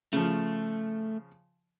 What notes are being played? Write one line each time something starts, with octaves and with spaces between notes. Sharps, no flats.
C#3 F3 A3